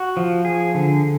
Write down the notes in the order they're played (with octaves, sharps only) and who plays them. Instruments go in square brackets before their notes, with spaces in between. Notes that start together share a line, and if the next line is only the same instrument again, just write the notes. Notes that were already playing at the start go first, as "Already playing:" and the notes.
Already playing: [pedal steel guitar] F#4
F3
G#4
D3